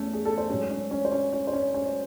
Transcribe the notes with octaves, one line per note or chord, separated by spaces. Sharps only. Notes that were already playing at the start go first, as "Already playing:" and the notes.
Already playing: E2 A3 C#4
G#4
A4
C5
G#2 F#3 C#4 C#5
C#4 C#5
C#4 C#5
C5
C#4 C#5
C#4 C#5
C5
C#4 C#5
C#4 C#5
C#5